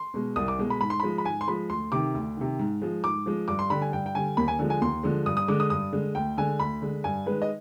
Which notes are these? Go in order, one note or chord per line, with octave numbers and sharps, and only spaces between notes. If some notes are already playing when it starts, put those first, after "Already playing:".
Already playing: C6
B2 G#3
C2 D#6
D6
B2 G#3
B5
G#2 B5
C6
F3 G#3 B5
B5
G#2 G#5
C6
F3 G#3 B5
D2 C6
C3 D#3 D6
D2
C3 D#3
G#2
F3 G#3
G#2 D6
F3 G#3
G2 D6
C6
D3 G3 B5
G#5
G2 G5
G5
D3 G3 G#5
D#2 B5
G#5
D3 F3 G#3
G#5
D#2 C6
D3 F3 G#3
G2 D#6
D#6
D3 G#3 D6
D#6
G2 D#6
D3 G#3
D2 G5
D3 G#3 G#5
D2 B5
D3 G#3
G2 G#5
D#3 G#3 B4
D#5